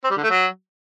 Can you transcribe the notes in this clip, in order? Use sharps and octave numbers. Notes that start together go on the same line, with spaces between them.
C4
G3
D3
A3
F#3